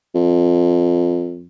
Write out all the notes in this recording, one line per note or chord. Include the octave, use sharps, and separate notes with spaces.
F2